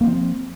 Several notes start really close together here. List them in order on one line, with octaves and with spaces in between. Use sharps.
A#3 C4 F3